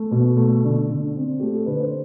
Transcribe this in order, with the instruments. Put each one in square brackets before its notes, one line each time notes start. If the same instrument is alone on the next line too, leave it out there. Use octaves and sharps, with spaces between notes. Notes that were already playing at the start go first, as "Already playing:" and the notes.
Already playing: [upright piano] A3
B2
A3
D3
D3
C4
A3 G4
A4
D3 B4
C5